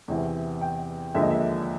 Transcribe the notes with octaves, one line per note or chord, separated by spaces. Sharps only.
E2 C3 E3
G5
D#2 D3 F3 G#3 E5
D#5
E5